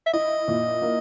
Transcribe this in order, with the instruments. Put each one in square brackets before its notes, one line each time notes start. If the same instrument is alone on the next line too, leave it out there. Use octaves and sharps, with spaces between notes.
[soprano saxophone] E5
[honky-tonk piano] E4 [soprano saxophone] D#5
[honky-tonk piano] A#2
A#3